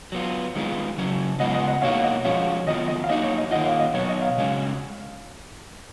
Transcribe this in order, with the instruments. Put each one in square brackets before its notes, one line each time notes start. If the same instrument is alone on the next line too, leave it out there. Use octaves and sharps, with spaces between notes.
[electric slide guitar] F#3 B3 F4
D#3 G#3 B3 F4
C#3 F#3 C#4
[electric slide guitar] C#3 G#3 B3 F4 [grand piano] D#5 F#5
[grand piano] D#5 F#5
D#5 F#5
[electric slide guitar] B2 A#3 D#4 F#4 [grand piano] C#5 F5
[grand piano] D#5 F#5
[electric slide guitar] F3 G#3 C#4 F#4 [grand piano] C#5 F5
[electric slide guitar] D#3 F#3 B3 F4 [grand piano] D#5
[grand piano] D#5
F5
[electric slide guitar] F#3 A#3 D#4 F#4 [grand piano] D#5
[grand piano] C#5
D#5
[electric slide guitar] D#3 A#3 F4 [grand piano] D#5 F#5
[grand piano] C#5 F5
D#5
[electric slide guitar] B2 F#3 B3 [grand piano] C#5
[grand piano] D#5
C#5 F5
[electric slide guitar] C#3 G#3 C#4 F#4